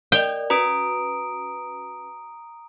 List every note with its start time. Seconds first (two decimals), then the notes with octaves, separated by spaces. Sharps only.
0.12 A#4 D5 D#5 G5
0.50 C#4 F#4 B4 A#5 D#6 D7